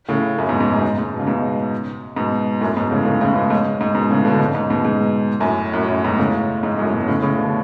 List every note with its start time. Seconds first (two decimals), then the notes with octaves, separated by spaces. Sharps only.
0.09 A2 C#3
0.38 F#2 A2
0.49 G#2 B2
0.60 G#2
0.72 F#2
0.82 G#2
0.98 G#2
1.13 B2
1.20 C#3
1.27 G#2 B2
2.17 G#2 B2
2.61 F#2 A2
2.76 G#2 B2
2.91 A2 C#3
3.05 A2 C#3
3.21 A2 C#3
3.36 G#2 B2
3.50 G#2
3.81 G#2
3.95 G#2 B2
4.11 A2 C#3
4.25 B2 D3
4.40 G#2
4.55 G#2
4.70 G#2 B2
4.85 G#2 B2
5.40 F#2 A2
5.73 F#2 A2
5.88 F#2 A2
6.04 G#2 B2
6.18 A2 C#3
6.63 G#2
6.78 F#2 A2
6.93 G#2 B2
7.08 A2 C#3
7.22 A2 C#3
7.38 B2 D3